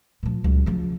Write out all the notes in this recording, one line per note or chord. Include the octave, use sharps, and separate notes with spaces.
A#2 F3
C#2 F#3
C#3 F3